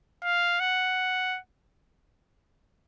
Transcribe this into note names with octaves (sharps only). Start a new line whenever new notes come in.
F5
F#5